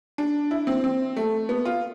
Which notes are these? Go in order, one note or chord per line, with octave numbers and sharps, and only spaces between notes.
D4
E4
C4
C4
A3
B3
F4